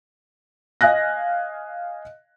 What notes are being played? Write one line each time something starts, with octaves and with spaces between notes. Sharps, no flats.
D#5 F5 G#5 F#6 A#6